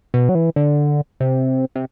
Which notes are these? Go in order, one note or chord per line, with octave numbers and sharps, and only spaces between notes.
B2
F#3
E3
D3
C3
C3